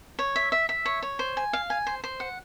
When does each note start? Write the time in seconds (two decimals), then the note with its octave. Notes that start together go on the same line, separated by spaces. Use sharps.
0.19 C#5
0.36 E5
0.52 E5
0.69 E5
0.85 C#5
1.02 C#5
1.19 C5
1.37 G#5
1.53 F5
1.70 G#5
1.87 C5
2.04 C5
2.20 F#5